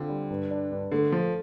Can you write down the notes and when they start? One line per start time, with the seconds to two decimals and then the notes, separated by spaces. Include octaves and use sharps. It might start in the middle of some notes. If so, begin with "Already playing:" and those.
Already playing: D3 C4 F4
0.09 G3
0.30 G2
0.51 D4
0.72 G2
0.91 D3 A3
1.12 F3 A4